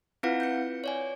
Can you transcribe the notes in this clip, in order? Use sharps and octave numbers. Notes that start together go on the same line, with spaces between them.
C4 E4 F4 B4 F5 F#5
G6 C#7
C#5 D5 G#5